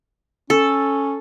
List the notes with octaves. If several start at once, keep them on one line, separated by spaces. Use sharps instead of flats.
C#4 A4